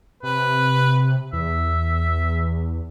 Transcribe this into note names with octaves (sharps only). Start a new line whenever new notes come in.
C3 B4
E2 E5